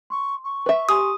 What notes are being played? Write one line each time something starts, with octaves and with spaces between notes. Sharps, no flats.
C6 C#6
C#6
B4 E5
G4 G#5 C6 D#6